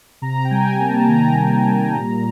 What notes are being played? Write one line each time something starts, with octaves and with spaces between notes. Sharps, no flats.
C3 A#5
G5
G3 G#5
A#3 A5
D#3 A#5
C3
G3
A#2